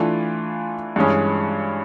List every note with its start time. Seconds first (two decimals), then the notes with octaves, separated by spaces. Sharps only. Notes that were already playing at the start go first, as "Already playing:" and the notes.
Already playing: E3 A3 D4 F4
0.96 G2 E3 G#3 C#4